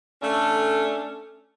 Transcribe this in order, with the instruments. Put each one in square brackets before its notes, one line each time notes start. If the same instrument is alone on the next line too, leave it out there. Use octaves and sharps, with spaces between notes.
[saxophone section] A3 C#4 D4 A4